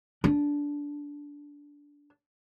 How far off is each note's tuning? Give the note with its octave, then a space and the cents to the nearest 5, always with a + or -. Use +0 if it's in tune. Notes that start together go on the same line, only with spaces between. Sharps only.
D4 -15